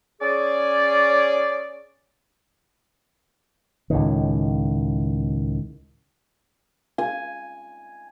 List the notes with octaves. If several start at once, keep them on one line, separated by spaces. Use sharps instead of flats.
C#4 G#4 D5
C#2 A2 D#3
G#5